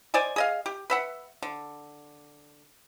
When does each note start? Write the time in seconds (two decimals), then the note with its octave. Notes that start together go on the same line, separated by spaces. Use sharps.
0.14 C5 D5 D#5 G#5
0.36 G#4 D#5 F5
0.66 G4
0.90 B4 E5 F#5
1.43 D3